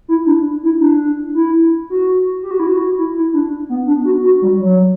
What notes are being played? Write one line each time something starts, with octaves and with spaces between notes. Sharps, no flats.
E4
D4
E4
D4
E4
F#4
G4
F#4
E4
F#4
E4
E4
D4
B3
D4
F#4
F#4
G3
F#3